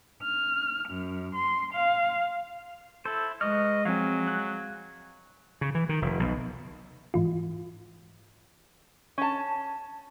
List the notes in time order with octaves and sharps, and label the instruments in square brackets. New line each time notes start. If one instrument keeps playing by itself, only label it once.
[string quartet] F6
F#2
C6
F5
[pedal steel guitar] E4 C5 [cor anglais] A4
[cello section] G#3 [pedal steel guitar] B4 C#6 F6 [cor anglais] D#5
[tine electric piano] F3 C4 [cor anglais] F#3 [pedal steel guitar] F5 G#5
[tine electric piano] F#6
[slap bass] C#3
E3
D#3
F1
B1
[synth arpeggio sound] G#2 E3 F4
[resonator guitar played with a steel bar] C#4 A5